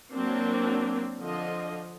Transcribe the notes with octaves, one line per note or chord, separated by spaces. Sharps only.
F#3 A#3 C4 D4
D3 F3 D#5